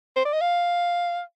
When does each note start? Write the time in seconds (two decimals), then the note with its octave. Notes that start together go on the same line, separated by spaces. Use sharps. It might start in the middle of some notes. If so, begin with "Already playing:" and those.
0.16 C5
0.25 D5
0.33 D#5
0.41 F5